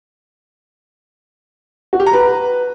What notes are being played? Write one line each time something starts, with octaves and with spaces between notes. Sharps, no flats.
F#4
G4
A#5
B4